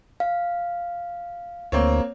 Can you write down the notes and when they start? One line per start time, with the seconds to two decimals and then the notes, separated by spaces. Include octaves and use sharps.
0.20 F5
1.72 D2 A#3 C4 C#5